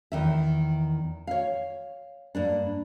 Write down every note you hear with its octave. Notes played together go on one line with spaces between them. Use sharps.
E2 D#3 E5
C#5 F5
G2 A#3 D4